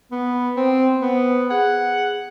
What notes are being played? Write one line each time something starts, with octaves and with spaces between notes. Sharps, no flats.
B3
C4 C5
B3
G#4 F#5